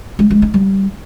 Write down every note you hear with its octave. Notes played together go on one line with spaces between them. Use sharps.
G#3
G#3
D#4
G3